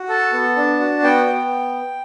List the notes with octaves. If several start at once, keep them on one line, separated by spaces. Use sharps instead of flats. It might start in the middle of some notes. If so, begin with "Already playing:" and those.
Already playing: F#4
A4 A5
B3
D4
F#4
B3 G5
B3